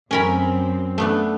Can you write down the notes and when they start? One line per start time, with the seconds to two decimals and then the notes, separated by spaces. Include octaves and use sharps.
0.11 F#2 C4 C#4 A#4 B5
0.98 A3 B3 D4